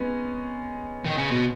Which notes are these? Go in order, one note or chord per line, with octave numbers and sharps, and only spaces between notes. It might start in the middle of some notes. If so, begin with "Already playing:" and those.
Already playing: G#3 B3 C#4 D#4
D#3
C#3
B2